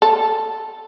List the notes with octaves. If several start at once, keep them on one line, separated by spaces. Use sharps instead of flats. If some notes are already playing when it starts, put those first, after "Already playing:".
A4